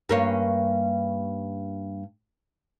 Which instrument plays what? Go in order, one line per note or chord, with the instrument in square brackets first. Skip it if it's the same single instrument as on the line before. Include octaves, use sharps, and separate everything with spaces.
[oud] G2 A#3 C#4